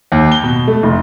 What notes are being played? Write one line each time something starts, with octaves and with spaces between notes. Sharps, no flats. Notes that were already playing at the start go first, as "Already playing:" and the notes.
D#2
G7
B2
A3
F1